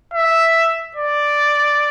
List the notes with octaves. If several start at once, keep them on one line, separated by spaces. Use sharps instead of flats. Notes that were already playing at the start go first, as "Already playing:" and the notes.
E5
D5